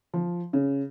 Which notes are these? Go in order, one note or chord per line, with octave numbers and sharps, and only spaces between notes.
F3
C#3